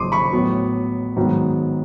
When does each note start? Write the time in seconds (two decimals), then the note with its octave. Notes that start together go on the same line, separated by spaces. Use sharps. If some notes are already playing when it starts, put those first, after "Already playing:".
Already playing: G#1 F#2 C#3 F3 A#3 C6 D6 D#6
0.12 B5 C#6
0.33 A2 F#3 B3
1.17 G#2 D#3 F#3 B3